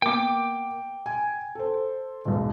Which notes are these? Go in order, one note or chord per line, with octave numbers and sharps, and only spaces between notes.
A#3 B3 G5 D6
G#5
A4 C5
E1 B1